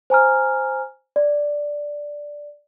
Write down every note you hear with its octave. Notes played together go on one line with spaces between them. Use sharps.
C5 G#5 A#5 F6
D5